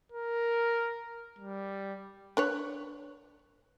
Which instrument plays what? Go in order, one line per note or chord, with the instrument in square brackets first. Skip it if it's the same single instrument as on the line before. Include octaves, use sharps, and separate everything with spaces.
[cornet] A#4
G3
[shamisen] D4 B4 C#5